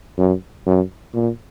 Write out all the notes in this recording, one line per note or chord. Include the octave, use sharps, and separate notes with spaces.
F#2
F#2
A#2